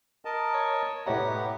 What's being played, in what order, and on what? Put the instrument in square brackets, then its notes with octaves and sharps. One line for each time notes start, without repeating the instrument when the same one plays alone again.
[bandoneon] A#4 D#5 A5
[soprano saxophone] C#5
[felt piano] A2 C#5 A#5 [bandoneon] B3 G4 [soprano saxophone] F#5